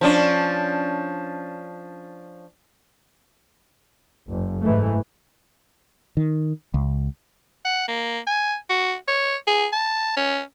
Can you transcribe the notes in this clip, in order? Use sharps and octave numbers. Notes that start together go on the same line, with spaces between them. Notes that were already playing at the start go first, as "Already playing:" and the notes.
F3 C#4 D4
F#1
G#2 E3 A3
D#3
C#2
F#5
A#3
G#5
F#4
C#5
G#4
A5
C#4